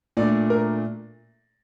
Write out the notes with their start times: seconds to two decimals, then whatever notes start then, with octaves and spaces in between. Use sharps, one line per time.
0.17 A#2 A3 D4 D5
0.50 A#4